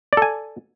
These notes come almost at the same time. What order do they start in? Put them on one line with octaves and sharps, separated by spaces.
D5 A4 G#5